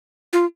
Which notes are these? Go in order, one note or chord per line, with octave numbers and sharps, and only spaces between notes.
F4